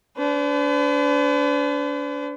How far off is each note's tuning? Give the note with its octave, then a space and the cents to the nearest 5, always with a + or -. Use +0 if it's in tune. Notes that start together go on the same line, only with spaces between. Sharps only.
D4 -35 B4 +45